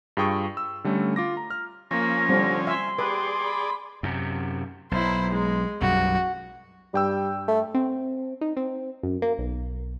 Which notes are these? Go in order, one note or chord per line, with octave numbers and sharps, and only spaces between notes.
G2 F4 G#4 G5 C#6 D#6
E6
D3 G3 A3 C#4
F4 D6 A#6
A#5
F6
F3 A#3 C#4 A#6
D3 G3 C4
E5 G#5 C6
G4 G#4 B4 D5
B5
F#2 C3
B1 E4 C5
G#3
B1 F#2 G3 F#4
G2 G3 G5 E6
A3
C4
D#4
C4
F#2
A#3
B1